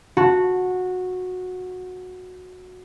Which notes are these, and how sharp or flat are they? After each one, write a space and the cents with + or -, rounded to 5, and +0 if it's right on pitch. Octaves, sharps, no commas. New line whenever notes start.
F#4 -15 A5 +0